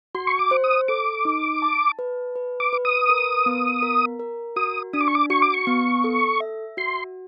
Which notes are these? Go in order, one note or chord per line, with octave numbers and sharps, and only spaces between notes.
F#4 C6
C#6
D6
C5
D#6
A4 D6
D#4
A5
B4
B4
D6
B4
D#6
A#4
B3
A#4
A#4
F#4 D#6
D4 D#6
D6
C#6
D6
F#4 C#6
D6
C#6
B3
A4
E5
F#4 C6